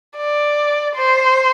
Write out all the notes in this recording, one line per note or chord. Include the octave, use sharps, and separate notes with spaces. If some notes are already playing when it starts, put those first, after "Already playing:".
D5
C5